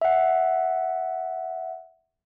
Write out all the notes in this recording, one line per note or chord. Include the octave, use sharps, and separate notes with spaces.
E5 F#5